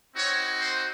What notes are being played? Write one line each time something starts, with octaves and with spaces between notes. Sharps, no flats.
C4 D#4 F#4 C#5
C5